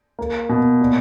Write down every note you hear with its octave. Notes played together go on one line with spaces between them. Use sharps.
A#3
B2
A#2